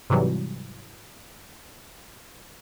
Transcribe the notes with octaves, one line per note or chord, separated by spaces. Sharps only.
G#2 C3 E3 F#3 G3